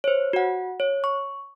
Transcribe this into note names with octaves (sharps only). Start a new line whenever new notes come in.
C5 C#5
F#4 F#5
C#5
C#6